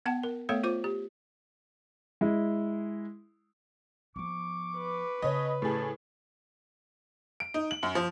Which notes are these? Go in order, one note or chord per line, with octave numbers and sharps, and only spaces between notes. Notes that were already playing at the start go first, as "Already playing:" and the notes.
B3 F#5 A5
A#4
A3 B3 A4 C#5 F5
F4 C5 D6
G4
G#3 E4
F3 B3 C#6 D6
B4
C#3 C#4 C#5 D#5 A5 B5
A2 C#4 G4 G#4 A5
D7
D#4
F#7
F#2
F3